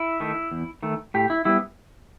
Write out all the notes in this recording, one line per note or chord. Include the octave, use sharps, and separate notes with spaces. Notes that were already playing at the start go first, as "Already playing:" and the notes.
Already playing: E4
D#3 A3
E2
D#3 A3
A2 G4
E4
G3 B3 E4